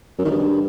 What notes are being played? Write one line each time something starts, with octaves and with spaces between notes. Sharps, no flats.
F#2
D#3
G2